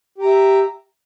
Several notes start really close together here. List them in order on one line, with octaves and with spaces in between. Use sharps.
G4 A#5 E5